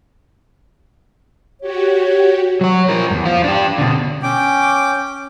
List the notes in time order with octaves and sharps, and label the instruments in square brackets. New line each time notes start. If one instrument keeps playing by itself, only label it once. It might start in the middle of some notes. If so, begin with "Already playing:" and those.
[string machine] F#4 G4 [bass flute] C#5
[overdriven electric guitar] F#3 C#5
F3 A#4
E2 G2
F3 F4
D4 G4
B2 D3
[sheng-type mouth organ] C#4 G5 D6